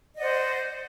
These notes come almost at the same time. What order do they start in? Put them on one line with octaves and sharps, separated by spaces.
D#5 D5 F#5 C5